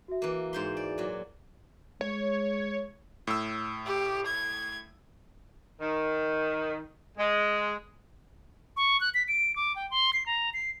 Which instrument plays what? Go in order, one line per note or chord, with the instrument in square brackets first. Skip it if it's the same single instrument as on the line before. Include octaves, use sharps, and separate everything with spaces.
[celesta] F#4 E5
[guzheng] E3 A#3
G#2 C5 C6
D5
A#2 F#3
[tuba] G#3 [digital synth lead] C#5
[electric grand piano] A2 E6
[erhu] G4
G#6
[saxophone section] D#3
G#3
[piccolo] C#6
F#6
B6
D7
D6
G5
C6
C7
A#5
C7